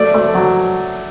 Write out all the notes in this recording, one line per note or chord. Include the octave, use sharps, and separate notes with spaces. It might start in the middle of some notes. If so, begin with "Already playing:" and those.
Already playing: A3 D5
A3
F#3